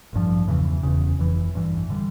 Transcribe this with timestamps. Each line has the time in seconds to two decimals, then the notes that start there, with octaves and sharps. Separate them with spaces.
0.13 A1 G2 F3
0.48 E2 C#3 E3
0.83 E1 E2 C#3
1.19 F1 F2 E3
1.54 A1 G2 E3
1.90 D3 G3